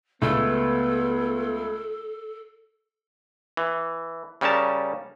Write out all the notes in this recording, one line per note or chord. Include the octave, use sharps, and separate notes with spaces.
C#2 A3 B3 A4
E3
C#3 G3 C#4 A#4 A5